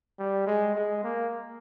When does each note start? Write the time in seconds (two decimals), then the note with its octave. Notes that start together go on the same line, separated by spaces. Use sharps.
0.19 G3
0.47 G#3
0.75 G#3
1.04 A#3